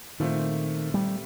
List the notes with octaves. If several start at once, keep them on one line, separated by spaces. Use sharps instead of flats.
A#2 D#3 A3 C4
G3